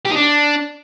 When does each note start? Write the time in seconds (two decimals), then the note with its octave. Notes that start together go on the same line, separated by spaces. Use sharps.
0.05 G4
0.10 D#4
0.16 D4